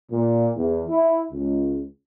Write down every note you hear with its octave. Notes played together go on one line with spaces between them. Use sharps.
A#2
E2
E4
C#2